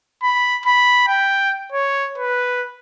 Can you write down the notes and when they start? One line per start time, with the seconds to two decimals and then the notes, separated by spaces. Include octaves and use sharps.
0.23 B5
0.66 B5
1.08 G5
1.72 C#5
2.18 B4